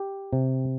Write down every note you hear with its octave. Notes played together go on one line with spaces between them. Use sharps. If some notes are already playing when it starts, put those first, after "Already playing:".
Already playing: G4
C3